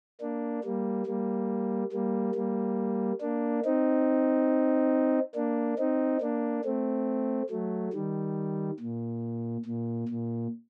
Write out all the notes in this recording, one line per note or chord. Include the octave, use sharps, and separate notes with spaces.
A#3 D4
G3 A#3
G3 A#3
G3 A#3
G3 A#3
A#3 D4
C4 D#4
A#3 D4
C4 D#4
A#3 D4
A3 C4
F#3 A3
D#3 G3
A#2
A#2
A#2